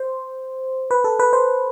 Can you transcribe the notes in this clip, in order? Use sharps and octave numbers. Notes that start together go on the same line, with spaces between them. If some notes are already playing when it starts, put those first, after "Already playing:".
Already playing: C5
B4
A4
B4
C5